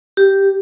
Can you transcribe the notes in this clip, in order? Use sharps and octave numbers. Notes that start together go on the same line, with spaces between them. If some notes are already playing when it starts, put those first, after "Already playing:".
G4